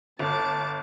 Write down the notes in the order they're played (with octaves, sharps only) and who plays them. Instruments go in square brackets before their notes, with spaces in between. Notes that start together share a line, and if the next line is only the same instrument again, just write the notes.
[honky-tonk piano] G1 [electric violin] A5 D6